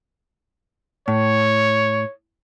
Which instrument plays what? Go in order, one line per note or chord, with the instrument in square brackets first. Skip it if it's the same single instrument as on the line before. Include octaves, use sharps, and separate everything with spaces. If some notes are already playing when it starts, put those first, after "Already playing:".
[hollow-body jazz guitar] A2 [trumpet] C#5